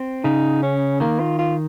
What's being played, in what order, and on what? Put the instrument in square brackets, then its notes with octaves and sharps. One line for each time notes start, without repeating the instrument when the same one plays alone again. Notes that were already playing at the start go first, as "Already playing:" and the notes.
Already playing: [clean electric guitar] C4
[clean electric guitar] C#3 [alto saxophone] D#4
[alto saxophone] C#4
[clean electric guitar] D#3 [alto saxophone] A#3
[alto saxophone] F4
F4